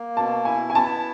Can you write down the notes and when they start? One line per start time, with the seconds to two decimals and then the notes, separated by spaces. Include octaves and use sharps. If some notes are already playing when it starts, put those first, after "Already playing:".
Already playing: A#3
0.17 B2 A5
0.45 E4 G#5
0.70 G#5
0.75 B3 A5